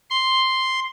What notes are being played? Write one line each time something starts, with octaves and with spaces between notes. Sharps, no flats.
C6